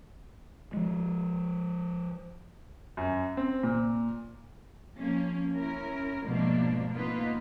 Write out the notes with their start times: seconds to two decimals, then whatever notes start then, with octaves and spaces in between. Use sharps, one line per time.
0.73 F3 G#3
2.97 F#2
3.37 C4
3.63 A#2
4.97 F3 A#3 C#4
5.53 C#4 E4 A#4
6.26 G#2 B2 F3 A3 A#3 D4
6.93 F3 A#3 B3 D#4 F4 B4